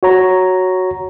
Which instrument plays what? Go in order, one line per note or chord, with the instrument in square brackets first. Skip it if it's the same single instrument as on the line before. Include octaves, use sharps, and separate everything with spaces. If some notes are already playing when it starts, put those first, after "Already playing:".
[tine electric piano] F#4 C#5 A#5